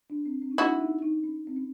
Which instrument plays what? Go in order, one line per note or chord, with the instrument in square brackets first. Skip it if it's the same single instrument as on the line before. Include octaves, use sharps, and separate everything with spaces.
[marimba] D4
C4
C4
D#4
[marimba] D4 [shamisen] E4 F#4
[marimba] D#4
D#4
C#4
C4
C#4